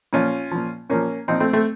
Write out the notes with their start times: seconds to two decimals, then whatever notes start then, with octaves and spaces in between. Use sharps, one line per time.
0.13 A#2 F3 C#4 F4
0.51 A#2 F3
0.90 A#2 F3 A#3 C#4
1.28 A#2 F3 C4 D#4
1.40 A3 C4
1.53 A3 C4